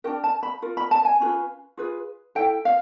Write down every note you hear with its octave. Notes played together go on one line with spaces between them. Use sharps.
D4 F#4 A#4 G5
A5
B5
F4 A#4
B5
A5
G#5
C#4 F4 G#4 B4
F4 G#4 B4
E4 A4 G5
F5